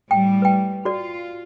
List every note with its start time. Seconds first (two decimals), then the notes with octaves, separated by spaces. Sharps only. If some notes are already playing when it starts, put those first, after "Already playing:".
0.11 A2 G3 G5
0.42 B4 G5
0.85 F4 F#4 D5